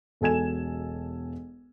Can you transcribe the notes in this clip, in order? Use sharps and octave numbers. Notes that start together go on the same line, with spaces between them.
E1 B1 A4 G#5 G#6 E7